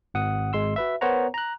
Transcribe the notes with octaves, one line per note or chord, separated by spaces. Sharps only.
G#1 F#5 D#6
G#1 G#3 C6 E6
F#4 B4 E5
B3 A#4 C5 C#5 F#5 A#5
A#5 F#6